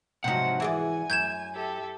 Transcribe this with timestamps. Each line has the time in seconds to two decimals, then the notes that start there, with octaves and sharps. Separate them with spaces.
0.24 G#2 C3 F3 F#3 D#4 F#5
0.60 E3 G#4 D5 G#5
1.10 F#2 G6 G#6 E7
1.54 G4 A4 E5